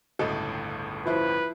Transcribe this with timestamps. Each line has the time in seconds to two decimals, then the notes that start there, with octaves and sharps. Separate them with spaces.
0.19 G1 C#2 A2 A4 D#5 A5
1.06 F3 E4 B4 C5